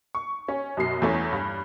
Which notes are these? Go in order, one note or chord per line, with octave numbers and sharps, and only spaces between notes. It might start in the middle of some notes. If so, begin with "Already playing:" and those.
C#6
C#4
F#2 B2 C7
E2 E3 A3 C#4
G2